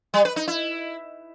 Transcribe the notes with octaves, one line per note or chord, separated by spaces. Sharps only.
G3
B4
D#4
E4